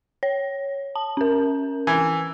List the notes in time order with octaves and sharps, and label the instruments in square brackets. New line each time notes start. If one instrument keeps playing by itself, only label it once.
[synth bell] C#5
A5
C#4 A#4
[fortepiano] E3